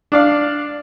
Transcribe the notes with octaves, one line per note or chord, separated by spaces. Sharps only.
D4 D5 F5